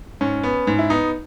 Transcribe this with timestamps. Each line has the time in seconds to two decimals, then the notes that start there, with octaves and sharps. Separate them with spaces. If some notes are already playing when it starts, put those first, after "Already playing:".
0.21 G#2 C#4
0.43 B3
0.67 G#2
0.79 E4
0.90 B3 D#4